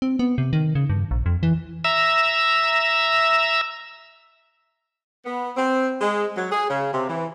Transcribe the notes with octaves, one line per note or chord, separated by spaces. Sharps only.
C4
B3
C3
D#3
C#3
G2
A#1
F2
E3
E5 A#5 E6
B3
C4
G#3
F#3
G#4
C#3
C3
E3